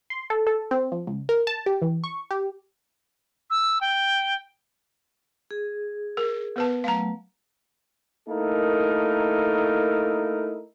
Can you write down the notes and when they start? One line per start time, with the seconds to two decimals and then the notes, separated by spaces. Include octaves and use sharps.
0.10 C6
0.30 A4
0.47 A4
0.71 C4
0.92 F3
1.07 C#2
1.29 A#4
1.47 A5
1.66 G4
1.82 E3
2.04 C#6
2.31 G4
3.50 E6
3.81 G5
5.51 G#4
6.17 A#4
6.56 B3 B4 A5
6.84 F#3 A3 F5 A#5
8.29 A3 A#3 D#4 E4 A4 A#4